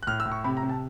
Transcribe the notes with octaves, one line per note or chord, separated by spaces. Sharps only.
F#6
A2 F6
E6
A2
C#6
C3 B5
A#5
C3
A5